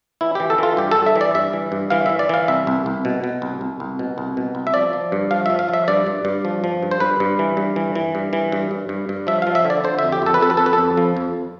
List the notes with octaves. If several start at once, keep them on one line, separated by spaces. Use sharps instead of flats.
E3 E4
E3 G4
A4
E3 F4
G2 G4
A4
G2
E5
E3
D5
G2 E5
E3
G2
E3 F5
E3 E5
D5
E3 F5
C2 E5
C2
C2
B2
B2
C2
C2
C2
B2
C2
B2
C2
E5
F3 D5
F3
G2
F3 F5
F3 E5
F5
F3 E5
G2 D5
G2
G2
F3
F3
G2
C5
G2 B4
G2
E3
G2
E3
E3
G2
E3
G2
G2
G2
G2
F3 E5
F3 F5
E5
D3
D5
D3 C5
F2 E5
G4
F2 A4
B4
F2 A4
B4
F2 A4
B4
A4
F2
F3
F2